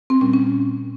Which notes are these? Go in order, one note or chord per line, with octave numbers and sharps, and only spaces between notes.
C4
A#2 G3 C#4
C#4